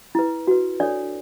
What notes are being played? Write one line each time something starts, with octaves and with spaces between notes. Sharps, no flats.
E4 B4
F#4 B4
D4 A4 C#5 D5